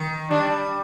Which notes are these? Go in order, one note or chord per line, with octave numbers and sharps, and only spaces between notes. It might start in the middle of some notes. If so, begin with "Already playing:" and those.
Already playing: D#3
G3 D4